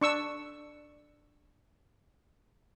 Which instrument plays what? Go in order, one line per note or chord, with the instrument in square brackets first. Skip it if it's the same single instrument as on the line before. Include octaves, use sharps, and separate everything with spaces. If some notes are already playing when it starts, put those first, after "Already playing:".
[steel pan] D4 C#6 E6